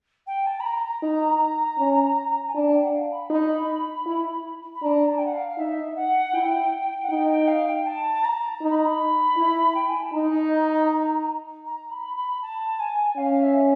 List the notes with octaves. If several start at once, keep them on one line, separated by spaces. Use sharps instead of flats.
G5
A5
B5
A#5
A#5
D#4
C#4
G#5
D4 A5
G5
F#5
F5
B5
D#4
E4
B5
D4 A#5
A5
G5
F#5
F5
F5
D#4 E5
F#5
E4 G5
F#5
D#4 G5
G5
F5
G5
A5
A#5
D#4
B5
A#5
B5
E4
G5
G#5
A5
D#4 A#5
A#5
B5
B5
A5
G#5
C#4 F5
E5